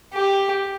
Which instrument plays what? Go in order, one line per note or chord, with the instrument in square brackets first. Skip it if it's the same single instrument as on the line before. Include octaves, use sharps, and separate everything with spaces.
[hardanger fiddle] G4